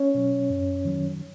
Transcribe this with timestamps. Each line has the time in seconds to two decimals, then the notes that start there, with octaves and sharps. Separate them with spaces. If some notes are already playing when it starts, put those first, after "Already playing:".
Already playing: C#4 C#5
0.15 B2 F#3
0.50 F#2
0.85 D#3 F#3